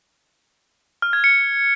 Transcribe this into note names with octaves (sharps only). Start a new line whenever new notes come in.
F6
G#6
C#7